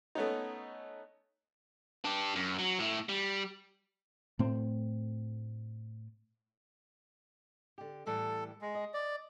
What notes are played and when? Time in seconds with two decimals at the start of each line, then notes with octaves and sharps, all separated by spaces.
0.15 A3 B3 C#4 D#4
2.05 D4 G4
2.36 F#2
2.59 F#3
2.79 A2 A3
3.09 G3
4.39 A2 A3 C4
7.78 D3 G4
8.06 A2 E3 G3 A4
8.61 G#3
8.75 D#5
8.94 D5